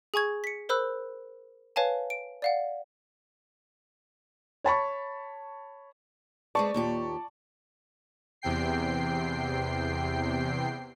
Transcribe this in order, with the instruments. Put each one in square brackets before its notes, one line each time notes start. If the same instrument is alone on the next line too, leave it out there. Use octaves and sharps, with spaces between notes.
[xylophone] G#4 G#5 C#6 G#6
B6 C#7
A#4 C5 B5 E6 F#6
B4 C#5 F5 G#5 A5
D7
D5 F5 F#5
[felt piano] C#5 A5 B5 C#6
[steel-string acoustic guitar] G#3 C4 B4 [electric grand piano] D5 A5 C#6
[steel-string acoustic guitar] D#2 A#2 G4
[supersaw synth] E2 C3 G5 C7